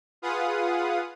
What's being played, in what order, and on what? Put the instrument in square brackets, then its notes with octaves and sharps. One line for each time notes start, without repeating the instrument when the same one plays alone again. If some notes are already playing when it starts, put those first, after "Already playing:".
[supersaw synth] F4 G#4 B4 F5 F#5 D#6